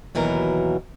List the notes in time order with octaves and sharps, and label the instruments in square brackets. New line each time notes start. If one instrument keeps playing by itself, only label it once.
[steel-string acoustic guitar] D#2 B2 E3 F#3 A#4